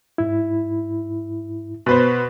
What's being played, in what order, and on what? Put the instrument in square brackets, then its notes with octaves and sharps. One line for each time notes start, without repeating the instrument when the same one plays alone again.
[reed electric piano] G#2 E4
[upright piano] B2 B4 C5